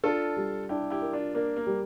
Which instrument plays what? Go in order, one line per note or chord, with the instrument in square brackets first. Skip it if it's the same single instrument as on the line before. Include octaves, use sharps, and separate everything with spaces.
[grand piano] D4 [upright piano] F4 A4
[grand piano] G3
[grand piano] D4 [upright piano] E4 G4
[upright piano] E4 G4
[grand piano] A#4
[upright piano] D4 F4
[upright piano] A#3 D4 [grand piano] A#4
[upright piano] A#3
[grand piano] G3